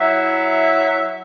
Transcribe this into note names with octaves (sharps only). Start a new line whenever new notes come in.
F#3 E4 E5